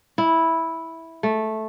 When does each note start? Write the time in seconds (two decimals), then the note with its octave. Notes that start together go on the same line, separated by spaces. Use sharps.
0.18 E4
1.23 A3